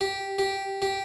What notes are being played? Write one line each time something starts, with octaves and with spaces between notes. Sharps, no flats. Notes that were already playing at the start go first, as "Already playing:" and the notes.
G4
G4
G4